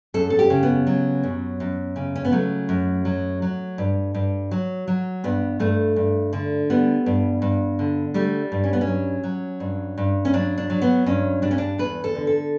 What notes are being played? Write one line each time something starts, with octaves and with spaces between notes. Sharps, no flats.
F#2 A4
A4
G4
C#3
B3
F#3
F#2
F#2
C#3
C#4
B3
F#3 A3
F#2
F#3
F#3
G2
G2
F#3
F#3
G2 B3
G2 A3
G2
D3
G3 B3
G2
G2
D3
G3 A3
G2
C#4
B3
C#4
F#3
F#3
G2
G2
C#4
F#3 D4
D4
F#3
B3
G2 C#4
G2 D4
C#4
D4
E2 B4
A4
D3
A4